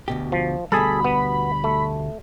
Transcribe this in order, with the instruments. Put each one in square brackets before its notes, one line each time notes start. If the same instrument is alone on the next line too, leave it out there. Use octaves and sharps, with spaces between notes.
[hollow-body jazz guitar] D2 B2 G4
[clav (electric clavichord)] F3
[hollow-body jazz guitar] D2 B2 G3 [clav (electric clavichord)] G#4 A4 [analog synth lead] B5
[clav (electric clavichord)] B3
A3